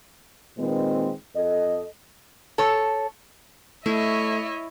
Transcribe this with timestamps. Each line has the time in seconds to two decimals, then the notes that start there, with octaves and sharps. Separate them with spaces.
0.58 A#2 D#3 G#3 C4 B4
1.36 F2 A4 D#5
2.58 A4 C#5
3.86 A3 E4 C#5 D#5 E5